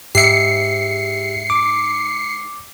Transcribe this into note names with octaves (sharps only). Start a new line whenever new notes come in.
G#2 G4 E5 C7 C#7
D6